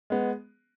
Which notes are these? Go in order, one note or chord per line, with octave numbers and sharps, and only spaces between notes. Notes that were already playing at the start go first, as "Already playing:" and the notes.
G#3 B3